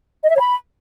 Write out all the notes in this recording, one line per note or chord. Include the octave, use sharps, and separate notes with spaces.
D#5
E5
C#5
B5